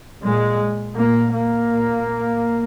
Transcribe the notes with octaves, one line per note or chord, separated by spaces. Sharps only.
A#2 G#3
A#2 A#3
A#3
A#2